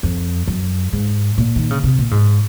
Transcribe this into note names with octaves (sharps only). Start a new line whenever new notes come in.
F2
F#2
G#2
A#2
D#3
C#3
C3
A#2
G#2